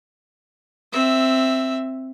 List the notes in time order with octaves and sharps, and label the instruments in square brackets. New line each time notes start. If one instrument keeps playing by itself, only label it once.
[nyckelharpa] C4 E5